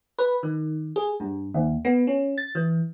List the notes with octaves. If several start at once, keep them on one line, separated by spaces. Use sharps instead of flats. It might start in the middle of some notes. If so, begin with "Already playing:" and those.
B4
D#3
G#4
G2
D#2
B3
C#4
A6
E3